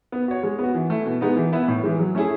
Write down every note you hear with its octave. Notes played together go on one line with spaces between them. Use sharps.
B3
F#4 C#5
G#3
B3
F#4
E3
A3 E4
B2
G#3 B3 D#4
E3
B3 E4 B4 E5
A2
E3 G#3
F#3
A3 C#4 E4 G#4